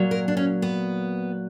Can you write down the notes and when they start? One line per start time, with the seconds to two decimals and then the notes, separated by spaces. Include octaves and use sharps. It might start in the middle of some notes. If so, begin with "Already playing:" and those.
Already playing: A#2 F#3
0.11 A#4
0.28 D4
0.37 C#4
0.62 B3